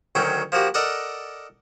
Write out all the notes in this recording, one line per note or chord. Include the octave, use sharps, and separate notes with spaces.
D2 D#3 F#3 C#4 G5
F3 A#3 F#4 G4
A4 A#4 D5 D#5 F#5